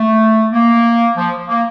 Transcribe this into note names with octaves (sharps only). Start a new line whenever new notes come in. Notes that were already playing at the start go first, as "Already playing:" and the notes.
Already playing: A3
A#3
F3
A#3